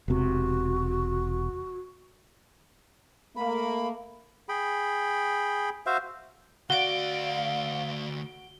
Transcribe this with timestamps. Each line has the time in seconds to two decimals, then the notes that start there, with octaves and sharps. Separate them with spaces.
0.08 E1 C3 F#4
3.36 A3 A#3 B5
4.49 G#4 G5 B5
5.86 F#4 C5 E5 F5
6.70 D2 F#4 D5 F5 D7 G7